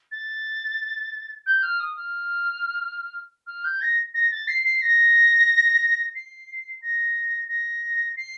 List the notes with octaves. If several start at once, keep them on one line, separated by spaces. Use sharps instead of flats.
A6
G6
F6
D#6
F6
F6
G6
A#6
A#6
A6
C7
C7
A#6
C7
A#6
A#6
C7